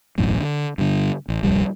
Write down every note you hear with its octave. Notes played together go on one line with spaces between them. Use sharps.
E1 A1 F#2 A2
D3
G2 D3
A1
D1 C2 F2 G3